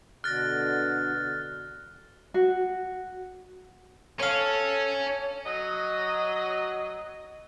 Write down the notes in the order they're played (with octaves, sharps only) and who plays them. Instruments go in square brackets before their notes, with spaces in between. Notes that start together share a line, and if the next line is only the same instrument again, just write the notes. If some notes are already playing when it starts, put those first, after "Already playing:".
[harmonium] B2 D3 [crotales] F6 A6 [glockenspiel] F#6 A#6
[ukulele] F#4
[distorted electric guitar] C#4 [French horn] A4 [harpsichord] C#5 F5
[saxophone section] F#3 D#5